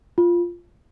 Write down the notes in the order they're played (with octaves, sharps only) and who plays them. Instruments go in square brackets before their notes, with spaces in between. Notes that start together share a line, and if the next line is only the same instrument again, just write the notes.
[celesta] F4